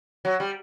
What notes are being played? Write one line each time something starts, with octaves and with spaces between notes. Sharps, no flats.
F#3
G3